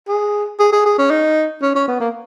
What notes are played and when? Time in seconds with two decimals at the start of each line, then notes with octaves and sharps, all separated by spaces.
0.08 G#4
0.59 G#4
0.72 G#4
0.86 G#4
0.98 C#4
1.10 D#4
1.62 C#4
1.75 C#4
1.88 B3
2.00 A#3